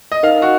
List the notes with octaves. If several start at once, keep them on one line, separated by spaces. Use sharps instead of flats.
D#5
D#4 A#4 D#5 F5
F#4